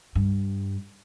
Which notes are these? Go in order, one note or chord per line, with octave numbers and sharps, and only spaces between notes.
G2